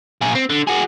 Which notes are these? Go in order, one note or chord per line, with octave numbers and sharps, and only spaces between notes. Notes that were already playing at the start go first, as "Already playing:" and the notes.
A#2 G#4
C4
D3
F#4 G#4